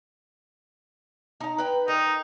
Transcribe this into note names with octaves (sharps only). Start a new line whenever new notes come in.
D#4 A#5
B4 G5
D#4 A#4